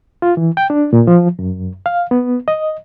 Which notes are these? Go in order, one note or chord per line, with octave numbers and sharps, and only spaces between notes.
F4
E3
G5
D4
A#2
F3
F#2
F5
B3
D#5